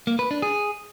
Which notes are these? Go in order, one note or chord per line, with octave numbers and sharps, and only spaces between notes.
A#3
B4
D4
G#4